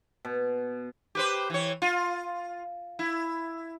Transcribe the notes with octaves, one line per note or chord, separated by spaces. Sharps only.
B2
G4 B4 C5
E3 C#5
F4
E4